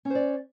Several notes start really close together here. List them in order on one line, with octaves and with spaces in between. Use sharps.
C#4 C5 D5